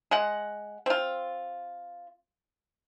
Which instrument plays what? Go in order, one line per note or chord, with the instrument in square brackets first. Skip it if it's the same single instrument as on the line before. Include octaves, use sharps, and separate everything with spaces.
[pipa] G#3 F#5
C4 F4